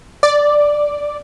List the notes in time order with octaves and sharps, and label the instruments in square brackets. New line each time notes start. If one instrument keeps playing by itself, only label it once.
[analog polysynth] D5